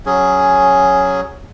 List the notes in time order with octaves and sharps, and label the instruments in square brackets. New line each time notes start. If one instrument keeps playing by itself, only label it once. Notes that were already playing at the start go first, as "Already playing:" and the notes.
[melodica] F#3 C#4 G#4